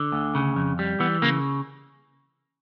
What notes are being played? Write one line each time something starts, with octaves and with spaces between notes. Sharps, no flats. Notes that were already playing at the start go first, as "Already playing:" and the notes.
Already playing: D3
D2
C#3
F2
G3
E3 B3
C#3 A#3